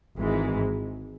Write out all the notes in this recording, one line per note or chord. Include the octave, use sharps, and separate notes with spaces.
G#1 G#2 E3 G#3